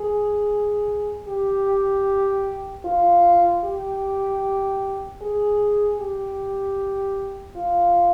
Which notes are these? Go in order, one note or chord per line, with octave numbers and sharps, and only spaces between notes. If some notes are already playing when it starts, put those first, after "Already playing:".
Already playing: G#4
G4
F4
G4
G#4
G4
F4